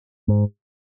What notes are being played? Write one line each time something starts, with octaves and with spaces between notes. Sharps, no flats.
G#2